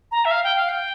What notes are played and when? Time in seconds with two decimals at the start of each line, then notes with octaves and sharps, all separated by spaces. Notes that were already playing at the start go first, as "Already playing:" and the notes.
0.12 A#5
0.25 E5
0.31 F5
0.44 G5
0.56 F5
0.69 G5